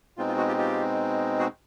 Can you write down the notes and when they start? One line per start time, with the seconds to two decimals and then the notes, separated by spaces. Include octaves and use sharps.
0.17 B2 G#3 C4 D#4 F4
0.28 F4
0.37 F#4
0.48 F4 G4
0.58 F4 G4
1.39 F#4 G#4